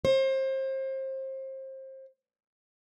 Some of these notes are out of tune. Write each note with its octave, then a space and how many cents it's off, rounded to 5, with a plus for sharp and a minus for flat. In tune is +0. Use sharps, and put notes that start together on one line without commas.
C5 +30